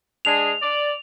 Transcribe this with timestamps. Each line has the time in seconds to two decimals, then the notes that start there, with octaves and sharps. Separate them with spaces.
0.25 G#3 D4 G#4 F7
0.61 D5